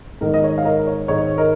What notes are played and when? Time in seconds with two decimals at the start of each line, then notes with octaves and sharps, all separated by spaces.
0.21 G#2 D#3 G#3 D#4 A#4
0.34 D#5
0.44 C#5
0.58 F5
0.65 A#4 D#5
0.87 C#5
1.08 G#2 D#3 G#3 D#4 C#5
1.38 A#4 D#5